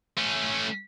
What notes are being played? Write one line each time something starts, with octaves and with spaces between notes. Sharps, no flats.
A3 C#4